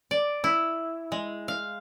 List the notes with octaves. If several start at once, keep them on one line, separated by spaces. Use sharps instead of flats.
D5
E4
G#3
F5